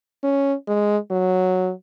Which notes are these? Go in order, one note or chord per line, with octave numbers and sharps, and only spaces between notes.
C#4
G#3
F#3